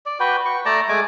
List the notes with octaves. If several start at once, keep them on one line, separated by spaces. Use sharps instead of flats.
D5
F#4 B4 G5
C#6
A3 D5 A5 A#5
G#3 A3 G#5 D6